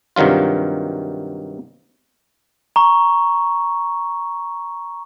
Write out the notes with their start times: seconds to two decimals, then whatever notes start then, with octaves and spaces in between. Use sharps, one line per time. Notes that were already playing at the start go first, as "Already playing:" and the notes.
0.16 G2 C3 D#3 F#3 F4
2.76 A#5 C#6